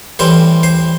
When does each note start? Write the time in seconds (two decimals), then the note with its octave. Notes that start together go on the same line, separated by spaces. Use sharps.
0.19 A2 E3 G3 C5 C6
0.63 C5 C6